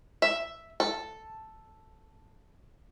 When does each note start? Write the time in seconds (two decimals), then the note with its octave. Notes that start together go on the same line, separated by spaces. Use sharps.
0.22 E5
0.80 A4